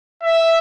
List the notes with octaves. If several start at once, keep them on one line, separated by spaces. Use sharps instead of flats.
E5